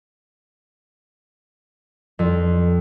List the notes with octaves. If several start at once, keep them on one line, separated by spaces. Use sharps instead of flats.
F2